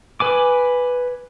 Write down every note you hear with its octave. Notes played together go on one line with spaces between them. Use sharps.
B4 G#5 D6